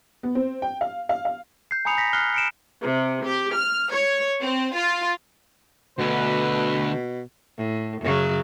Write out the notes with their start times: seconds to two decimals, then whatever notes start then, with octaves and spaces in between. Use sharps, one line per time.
0.23 B3
0.35 C4
0.62 G5
0.81 F5
1.09 F5
1.25 F5
1.71 G6 C7
1.85 G#5 A#5 B5 D#6 C#7 F7
1.98 A#6 B6
2.13 F6 F#6 C7 G7
2.34 C#7 D7 E7
2.83 C3
3.25 G4
3.56 F6
3.92 C#5
4.41 C4
4.75 F4
5.98 D2 B2 D3 B4
7.58 A2
8.02 F#2 C#3 F#3